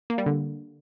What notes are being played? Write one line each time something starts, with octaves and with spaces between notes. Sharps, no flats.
A#3
G3
D3